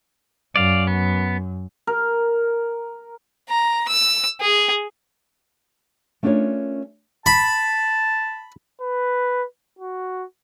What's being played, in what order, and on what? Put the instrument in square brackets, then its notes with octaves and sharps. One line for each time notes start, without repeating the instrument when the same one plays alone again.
[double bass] F#2 [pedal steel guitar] D5 F5
[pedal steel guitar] B3
[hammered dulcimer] A#4
[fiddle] A#5
E6
G#4
[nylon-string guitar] A3 C#4 D4 F4 A#4 C#5
[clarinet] A5 [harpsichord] B5
[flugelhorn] B4
F#4